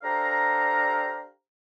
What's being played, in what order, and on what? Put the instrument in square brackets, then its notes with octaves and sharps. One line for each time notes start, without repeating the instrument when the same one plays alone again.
[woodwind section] D4 G4 A4 C5 F5 A#5